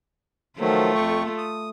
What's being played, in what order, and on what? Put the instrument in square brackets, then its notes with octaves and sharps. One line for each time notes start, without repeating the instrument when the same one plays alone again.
[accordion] D#3 F3 F#3 [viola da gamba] A3 F4
[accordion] F2 G5 C#6
D#6